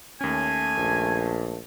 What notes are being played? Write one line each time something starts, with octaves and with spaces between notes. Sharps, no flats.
D#2 A3 C#4 G#5
A#1